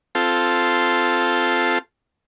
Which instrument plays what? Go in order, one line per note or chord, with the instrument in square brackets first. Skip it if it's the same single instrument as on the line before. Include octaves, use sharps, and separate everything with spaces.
[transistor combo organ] C4 F4 A4